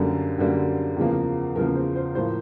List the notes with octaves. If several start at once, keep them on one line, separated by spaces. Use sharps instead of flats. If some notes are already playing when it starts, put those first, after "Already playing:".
Already playing: F#2 D3 G3 A#3 A4
F#2 D3 G3 A#3
E2 C#3 F3 A#3
E2 C#3 F3 A#3 A#4
C5
C5
A2 F3 A#3 C5